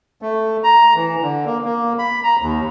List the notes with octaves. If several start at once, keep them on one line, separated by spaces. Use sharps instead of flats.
A3
A#5
E3
D3
A#3
A#3
B5
A#5
D#2